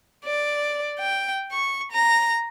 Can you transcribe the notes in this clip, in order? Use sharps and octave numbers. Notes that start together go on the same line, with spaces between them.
D5
G5
C#6
A#5